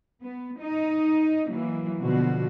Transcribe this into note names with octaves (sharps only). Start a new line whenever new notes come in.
B3
D#4 D#5
E3 F#3 A#3
B2 D3 F3 F#4